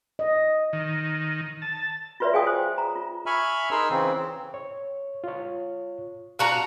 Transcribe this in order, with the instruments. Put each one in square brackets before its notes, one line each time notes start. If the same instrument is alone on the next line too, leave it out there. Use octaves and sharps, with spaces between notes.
[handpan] D#5
[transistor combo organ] D#3
A5
[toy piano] F4 F#4 B4 C#5 D5 E5
F4 G#4 F5 G5 G#5 D#6
C5
A#5
F4
[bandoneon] E5 G#5 B5 C#6 F6
D#4 G#4 A#4 C6 E6
C#3 E3 C4
C4
[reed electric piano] C#5
F4 C#5
[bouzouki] D4 F#4 A#5 [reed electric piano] F5